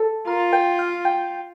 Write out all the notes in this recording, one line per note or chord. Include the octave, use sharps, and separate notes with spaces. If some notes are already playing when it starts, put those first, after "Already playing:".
Already playing: A4
F4 A#4
G5
F5
G5